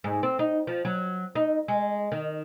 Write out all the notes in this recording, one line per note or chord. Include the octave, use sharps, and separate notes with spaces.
G#2
C4
D#4
F3
F#3
D#4
G#3
D#3